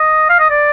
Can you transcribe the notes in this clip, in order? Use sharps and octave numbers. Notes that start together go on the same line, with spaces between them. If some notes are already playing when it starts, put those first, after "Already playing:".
Already playing: D#5
F5
D#5
D5